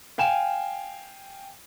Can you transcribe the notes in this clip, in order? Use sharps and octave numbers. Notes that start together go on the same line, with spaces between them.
F5 G5 G#5 E7